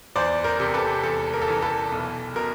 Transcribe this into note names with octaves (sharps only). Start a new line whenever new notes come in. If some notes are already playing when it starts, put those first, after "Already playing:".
E2 C5 D5
A#4 C5
C3
A4 B4
E2 A4
A#4
A4
E3 A#4
A4 B4
B1
B2 A#4